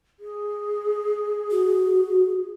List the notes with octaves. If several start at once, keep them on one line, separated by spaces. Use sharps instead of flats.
G#4
F#4